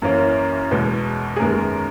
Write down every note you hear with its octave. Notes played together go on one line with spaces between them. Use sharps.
F#2 E3 A#3 C#4
E2 B2 G#3
G#4
F#2 D#3 G#3 B3 A#4